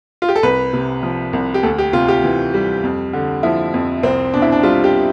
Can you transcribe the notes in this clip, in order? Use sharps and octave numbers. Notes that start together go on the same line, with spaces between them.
F4
G4
A4
C2 B4
C3
F3
C2
G4
D2 A4
G4
C3 F4
G4
E3
G3
F2
D3
F3 E4
F2
C2 C4
B2 D4
E4
D4
G3 F4
G4